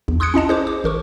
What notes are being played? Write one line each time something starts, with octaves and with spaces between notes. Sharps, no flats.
A#1 E2
C6 D#6 F#6 G#6 C#7
C#4 E4 D#5 A5
G#4 C5 D6
D6
A1 A#4 C#6